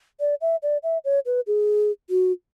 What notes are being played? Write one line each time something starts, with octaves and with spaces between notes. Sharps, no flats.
D5
E5
D5
E5
C#5
B4
G#4
F#4